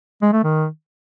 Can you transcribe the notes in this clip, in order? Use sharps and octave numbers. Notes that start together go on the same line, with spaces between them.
G#3
A3
D#3